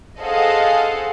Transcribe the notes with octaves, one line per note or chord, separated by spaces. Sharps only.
G#4 A4 C5 D#5 F5 F#5